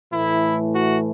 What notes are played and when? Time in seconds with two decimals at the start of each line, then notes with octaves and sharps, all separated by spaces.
0.12 A2 E3 A3 E4
0.76 F#4